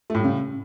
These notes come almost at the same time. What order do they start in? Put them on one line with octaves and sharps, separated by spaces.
A3 A2 G3 C#3